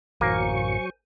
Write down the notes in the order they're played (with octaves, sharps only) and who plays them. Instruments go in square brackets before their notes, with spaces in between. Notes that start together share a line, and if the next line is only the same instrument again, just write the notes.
[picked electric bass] A1 F#2 E3 [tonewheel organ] F#3 C#6 [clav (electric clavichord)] A#3 [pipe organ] C5 G#5